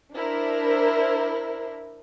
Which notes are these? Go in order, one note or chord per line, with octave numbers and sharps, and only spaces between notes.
D4 E4 A#4 C5